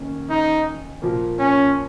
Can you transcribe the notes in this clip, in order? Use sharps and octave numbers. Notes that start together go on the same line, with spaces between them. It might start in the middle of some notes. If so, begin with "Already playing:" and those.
Already playing: D#3 A#3 C#4
D#4
A#2 F3 A#3
C#4